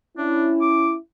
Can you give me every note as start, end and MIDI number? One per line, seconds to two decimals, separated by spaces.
0.18 0.96 61
0.18 0.51 62
0.18 0.96 64
0.61 0.92 86